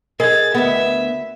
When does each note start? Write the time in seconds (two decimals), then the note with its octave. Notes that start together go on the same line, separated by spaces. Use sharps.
0.20 G#4 A#4 D#5 G#6 A6
0.54 D2 B3 E5